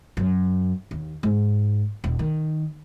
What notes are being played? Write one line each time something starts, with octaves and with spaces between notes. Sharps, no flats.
F#2
D#2
G#2
D#1
D#3